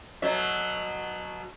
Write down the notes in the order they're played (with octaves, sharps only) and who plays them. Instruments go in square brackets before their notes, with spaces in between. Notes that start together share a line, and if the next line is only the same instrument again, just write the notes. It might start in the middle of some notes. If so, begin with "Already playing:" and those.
[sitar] B2 F#3 E5